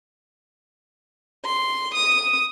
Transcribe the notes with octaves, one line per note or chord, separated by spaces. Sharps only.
C6
D#6